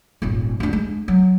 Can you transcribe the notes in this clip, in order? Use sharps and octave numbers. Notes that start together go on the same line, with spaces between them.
D#1 G#1
D2 D4
G#3
F#3